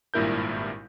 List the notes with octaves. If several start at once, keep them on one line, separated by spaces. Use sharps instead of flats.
G#1 G2 A#2 E4 A#4 G6